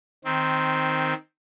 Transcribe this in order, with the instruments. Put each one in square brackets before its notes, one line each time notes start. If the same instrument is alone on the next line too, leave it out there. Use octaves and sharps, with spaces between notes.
[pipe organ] D#3 C4